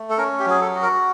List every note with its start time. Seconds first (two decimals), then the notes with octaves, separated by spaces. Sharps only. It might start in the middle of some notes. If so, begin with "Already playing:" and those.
Already playing: A3
0.10 A4
0.17 C#4 A#4
0.39 G4
0.46 F#3 G#4
0.61 A4
0.75 F#4
0.82 A#4